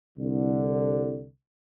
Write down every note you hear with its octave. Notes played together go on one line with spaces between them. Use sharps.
C2 D3